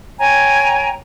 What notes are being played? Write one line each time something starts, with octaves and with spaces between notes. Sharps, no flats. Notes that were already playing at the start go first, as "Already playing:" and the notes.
C#5 G5 G#5 A#5